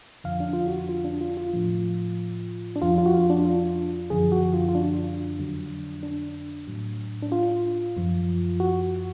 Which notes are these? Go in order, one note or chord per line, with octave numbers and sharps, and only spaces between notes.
F2 D3 F3 F5
D4
F4
F#4
F4
D4
F4
F4
A2 F3
D4
F2 F3 F4
F4
F#4
F4
D4
F4
F#2 D3 F3 G#4
F#4
F4
F4
D4
F2 D3 F#3
D4
A2 F#3
D4
F4
F#2 F3
F#4